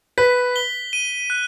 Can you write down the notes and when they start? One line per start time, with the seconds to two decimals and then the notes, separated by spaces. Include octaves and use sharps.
0.18 B4 B6
0.56 G7
0.93 D#7
1.30 F#6